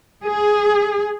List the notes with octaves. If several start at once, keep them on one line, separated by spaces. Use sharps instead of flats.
G#4